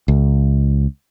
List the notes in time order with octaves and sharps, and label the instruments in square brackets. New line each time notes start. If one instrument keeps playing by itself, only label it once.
[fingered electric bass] C#2